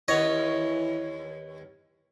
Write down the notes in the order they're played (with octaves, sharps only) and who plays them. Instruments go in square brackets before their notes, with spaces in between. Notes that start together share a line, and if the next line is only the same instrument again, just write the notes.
[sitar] D#2 B3 C#5 [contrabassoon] E3 [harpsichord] D#5